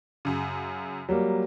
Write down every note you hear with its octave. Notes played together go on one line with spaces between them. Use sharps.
F#2 C#3
F#3 G3 A#3